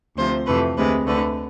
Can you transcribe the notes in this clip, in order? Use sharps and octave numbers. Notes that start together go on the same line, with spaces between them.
D2 C3 F3 C5
F2 C3 E3 A3 B4
D2 C3 G#3 B4
D2 D3 A3 B4